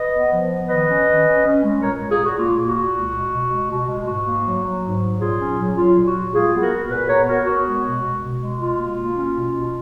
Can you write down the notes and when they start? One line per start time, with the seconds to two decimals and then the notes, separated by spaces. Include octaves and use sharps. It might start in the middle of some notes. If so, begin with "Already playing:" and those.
Already playing: B4 D#5
0.13 B3
0.32 F3
0.50 B3
0.69 D#3 B4 D#5
0.88 C#4
1.07 D#3
1.26 C#4
1.45 C#4
1.63 G#3
1.82 A#2 A#4 C#5
2.01 A#2
2.10 F4 G#4
2.20 A#2
2.25 F#4
2.38 A#3 F4
2.57 A#3
2.67 F#4
2.76 A#2
2.95 C#2
3.14 G#3
3.33 B2
3.51 G#3
3.70 B2
3.90 G#3
4.07 G#2 F#4
4.27 A#3
4.46 F#3
4.64 F#3
4.84 G#2
5.02 F#3
5.20 A#2 F4 G#4
5.39 C#4
5.58 F#3
5.77 F#3 F4
5.97 A#2
6.06 F#4
6.14 F#3
6.34 G#3 F4 G#4
6.53 B3
6.62 F#4 A#4
6.71 B3
6.90 A#2 G#4 B4
7.09 B3 A#4 C#5
7.28 B3 F#4 A#4
7.47 B3 F#4
7.66 G#3
7.85 B2
8.03 B2
8.22 B2
8.41 G#3
8.60 B2 F4
8.78 A#3
8.98 A#3
9.16 C#4
9.35 B2
9.53 B2